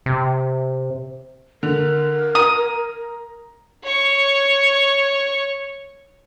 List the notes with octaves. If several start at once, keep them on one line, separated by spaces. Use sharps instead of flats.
C3
D3 A#4
A#5 D#6
C#5 C#6